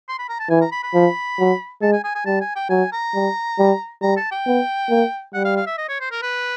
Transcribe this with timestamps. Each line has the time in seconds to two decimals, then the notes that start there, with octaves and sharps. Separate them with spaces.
0.09 C6
0.19 B5
0.29 A#5
0.39 A5
0.50 E3 G#5
0.61 A#5
0.72 B5
0.83 B5
0.94 F3
1.39 F#3
1.82 G#3 A5
1.93 G#5
2.04 G#5
2.15 G#5
2.26 G3 A5
2.41 G#5
2.56 G5
2.69 F#3 G#5
2.92 A#5
3.14 G3
3.59 G3
4.02 G3 A#5
4.17 A5
4.31 G5
4.47 B3
4.90 A#3
5.34 G3 F#5
5.45 F5
5.56 F5
5.67 E5
5.78 D#5
5.89 C#5
6.00 C5
6.11 A#4
6.22 B4